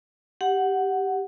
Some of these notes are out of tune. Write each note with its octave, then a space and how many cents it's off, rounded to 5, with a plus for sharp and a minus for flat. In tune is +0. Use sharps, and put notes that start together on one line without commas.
G4 +0 F#5 +5